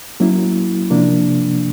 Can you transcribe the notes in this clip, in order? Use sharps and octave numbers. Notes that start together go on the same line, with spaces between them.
F#3 A#3 C#4 E4
C3 F3 A#3 D4